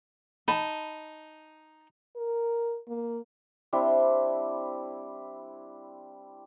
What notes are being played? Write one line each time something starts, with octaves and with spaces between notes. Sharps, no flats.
D#4 A5 B5
A#4
A#3
G3 C4 D4 E4